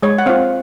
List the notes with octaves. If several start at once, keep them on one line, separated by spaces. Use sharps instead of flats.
G#3 C#5
F#5
C4 F4 F5